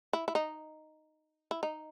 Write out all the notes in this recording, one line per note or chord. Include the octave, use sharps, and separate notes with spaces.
E4
E4
D#4
E4
D#4